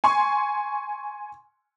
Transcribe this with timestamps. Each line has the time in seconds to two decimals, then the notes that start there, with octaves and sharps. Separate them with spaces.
0.04 G#5 C6 C#6